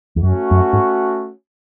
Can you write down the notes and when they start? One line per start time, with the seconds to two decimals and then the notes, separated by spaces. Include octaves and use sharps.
0.16 E2
0.23 F#2 A3 C#4 F#4
0.51 F#2
0.73 G#2